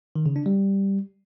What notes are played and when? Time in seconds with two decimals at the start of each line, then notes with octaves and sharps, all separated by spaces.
0.16 D#3
0.26 C#3
0.36 D4
0.46 G3